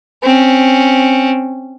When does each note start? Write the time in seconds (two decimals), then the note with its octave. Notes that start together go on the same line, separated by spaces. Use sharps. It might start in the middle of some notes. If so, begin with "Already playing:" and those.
0.23 C4 C#4